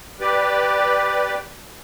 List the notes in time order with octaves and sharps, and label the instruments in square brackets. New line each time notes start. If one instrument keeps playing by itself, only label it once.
[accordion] G4 B4 D5